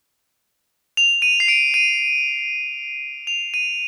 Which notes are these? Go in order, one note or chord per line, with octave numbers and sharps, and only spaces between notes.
F7
D#7
C7
D7
D#7
F7
D#7